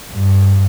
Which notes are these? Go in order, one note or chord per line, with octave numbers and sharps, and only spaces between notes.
G2